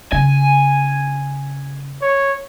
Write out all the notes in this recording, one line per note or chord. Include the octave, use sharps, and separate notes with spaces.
C#3 G#5
C#5